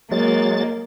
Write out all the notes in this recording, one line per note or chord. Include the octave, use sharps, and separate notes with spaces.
F#3 G#3 A#3 A6